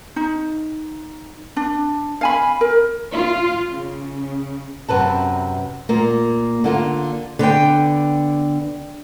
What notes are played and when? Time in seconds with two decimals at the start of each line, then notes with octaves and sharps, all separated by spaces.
0.16 D#4
1.56 D4
2.21 F5 G#5 B5
2.61 A#4
3.11 F4
3.72 C#3
4.89 F#2 C3 B4 A5
5.89 A#2 A#3
6.64 D3 A#3 F4
7.39 D3 B3 D5 G5